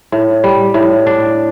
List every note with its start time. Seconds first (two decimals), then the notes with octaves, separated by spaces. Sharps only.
0.12 A2
0.44 G3
0.74 A2
1.07 D4